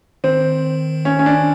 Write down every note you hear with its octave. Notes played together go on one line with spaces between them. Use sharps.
D#3 C4
C#4
C#4
D4